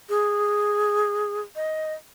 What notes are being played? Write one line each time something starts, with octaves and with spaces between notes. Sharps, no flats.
G#4
D#5